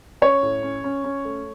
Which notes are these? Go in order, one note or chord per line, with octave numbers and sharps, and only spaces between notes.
C#4 C#5
A2
C#4
C#4
C#4
A3